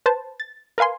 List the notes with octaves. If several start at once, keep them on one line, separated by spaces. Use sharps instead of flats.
B4 C5 A5
A6
A#4 B4 F5 G#5 C6